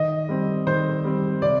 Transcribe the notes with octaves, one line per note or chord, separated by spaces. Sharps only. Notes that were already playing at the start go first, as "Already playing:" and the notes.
Already playing: D#3 D#5
G3 C4
D#3 C5
G3 C4
C3 D5